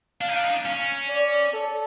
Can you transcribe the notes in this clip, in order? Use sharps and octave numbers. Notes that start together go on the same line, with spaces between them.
D4 F5
D#4
D4
D#4
D4
C#4
D5
A4